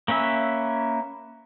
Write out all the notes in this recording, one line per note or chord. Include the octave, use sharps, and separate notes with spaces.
A#3 C#4 B4 E5